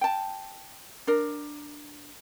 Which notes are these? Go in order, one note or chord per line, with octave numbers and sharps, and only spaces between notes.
G5 A5
D4 A#4